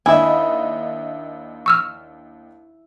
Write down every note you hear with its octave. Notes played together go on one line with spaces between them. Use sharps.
D#2 D4 E4 D#5 E5 G#5
C#6 E6 F6